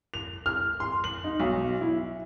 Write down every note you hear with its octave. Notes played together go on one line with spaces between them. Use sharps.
F7
F6
C6
F#7
D#4
B1
E4